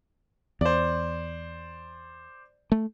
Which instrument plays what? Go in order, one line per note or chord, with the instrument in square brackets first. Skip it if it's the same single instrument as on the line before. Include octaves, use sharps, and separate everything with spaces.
[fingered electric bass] E2 [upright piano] C5 D5
[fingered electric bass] A3